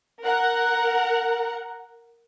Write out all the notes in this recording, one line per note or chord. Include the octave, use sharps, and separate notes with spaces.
A#4 F#5